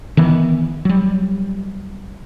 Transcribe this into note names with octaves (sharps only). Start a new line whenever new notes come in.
D#3 E3 B3
F#3 G3